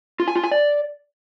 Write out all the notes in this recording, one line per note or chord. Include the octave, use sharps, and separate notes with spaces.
F4
G#5
F4
G#5
D5